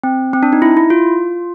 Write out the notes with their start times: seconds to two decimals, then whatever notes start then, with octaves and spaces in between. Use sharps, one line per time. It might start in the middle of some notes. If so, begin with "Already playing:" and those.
0.03 C4
0.33 C4
0.43 D4
0.53 D#4
0.62 E4
0.77 E4
0.90 F4